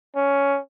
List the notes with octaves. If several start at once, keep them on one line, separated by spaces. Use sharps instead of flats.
C#4